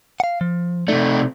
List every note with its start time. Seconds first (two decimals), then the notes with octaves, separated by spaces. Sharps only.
0.20 F5 F#5
0.41 F3
0.88 C3 A3 D#4 D5